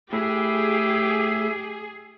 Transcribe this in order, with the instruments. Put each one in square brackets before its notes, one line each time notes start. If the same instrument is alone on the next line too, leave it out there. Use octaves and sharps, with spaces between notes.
[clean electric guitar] A2 [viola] G4 [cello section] G#4 [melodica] E5